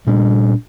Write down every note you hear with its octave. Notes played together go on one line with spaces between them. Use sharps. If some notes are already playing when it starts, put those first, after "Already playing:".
A#2 G3 D4